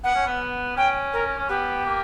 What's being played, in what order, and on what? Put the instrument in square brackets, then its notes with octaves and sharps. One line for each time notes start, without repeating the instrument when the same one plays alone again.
[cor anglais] B3 [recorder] F#5
[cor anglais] C#4
B3
[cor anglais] C#4 [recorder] G5
[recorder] A#4
[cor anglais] C#4
[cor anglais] B3 [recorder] G4
[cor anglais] A#3